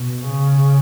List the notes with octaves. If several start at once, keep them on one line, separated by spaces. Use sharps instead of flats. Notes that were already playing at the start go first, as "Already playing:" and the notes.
Already playing: B2
C#3